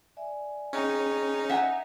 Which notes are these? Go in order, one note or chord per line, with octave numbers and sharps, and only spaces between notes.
D5 E5 G#5
C#4 D#4 G#4 G5 C#6
E5 F#5 G#5